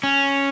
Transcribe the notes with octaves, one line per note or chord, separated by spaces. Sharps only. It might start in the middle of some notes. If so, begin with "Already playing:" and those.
C#4